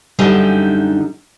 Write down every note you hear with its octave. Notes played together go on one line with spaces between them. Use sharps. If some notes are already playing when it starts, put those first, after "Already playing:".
F#2 D3 G3 D#4 E5 G#5